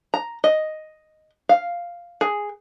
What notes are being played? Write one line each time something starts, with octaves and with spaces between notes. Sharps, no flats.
A#5
D#5
F5
G#4